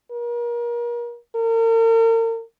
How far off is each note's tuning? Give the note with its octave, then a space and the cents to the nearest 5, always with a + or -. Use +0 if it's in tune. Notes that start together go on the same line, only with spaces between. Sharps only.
A#4 +35
A#4 -40